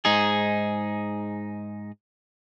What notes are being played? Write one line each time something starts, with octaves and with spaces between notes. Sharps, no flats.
G#2 D#4 G#4